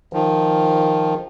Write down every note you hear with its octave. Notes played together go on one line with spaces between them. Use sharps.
D#3 F3